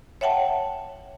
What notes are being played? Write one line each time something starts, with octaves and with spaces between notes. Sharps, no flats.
C#5 E5 F#5 G5 A5